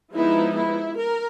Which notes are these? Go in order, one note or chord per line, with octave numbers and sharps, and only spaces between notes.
F3 G#3 B3 D#4 E4
E4
A#4